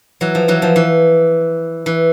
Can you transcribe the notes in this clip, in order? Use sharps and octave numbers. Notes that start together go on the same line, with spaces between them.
E3 F#3
F3
E3 F#3
F3
E3
E3